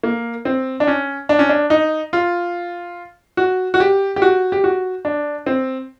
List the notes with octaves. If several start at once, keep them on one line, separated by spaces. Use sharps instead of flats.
A#3
C4
D4
C#4
D4
C#4
D4
D#4
F4
F#4
F#4
G4
G4
F#4
G4
F#4
D4
C4